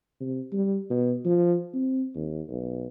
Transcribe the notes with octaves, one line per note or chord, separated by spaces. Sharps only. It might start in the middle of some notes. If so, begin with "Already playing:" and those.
C3
G3
B2
F3
C4
D#2
B1